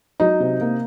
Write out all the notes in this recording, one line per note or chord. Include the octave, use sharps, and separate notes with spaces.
F#3 D#4
C3
A#3